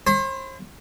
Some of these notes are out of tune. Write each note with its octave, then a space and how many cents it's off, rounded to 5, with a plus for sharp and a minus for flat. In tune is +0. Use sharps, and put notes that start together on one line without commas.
C5 +40 C6 -45